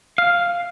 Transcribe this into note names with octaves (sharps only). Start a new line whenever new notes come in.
F5